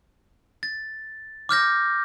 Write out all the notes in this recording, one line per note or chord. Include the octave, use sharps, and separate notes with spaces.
A6
D6 F6 G6 A#6